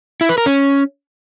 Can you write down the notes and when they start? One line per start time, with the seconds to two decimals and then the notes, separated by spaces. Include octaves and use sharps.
0.21 E4
0.29 B4
0.38 A#4
0.46 C#4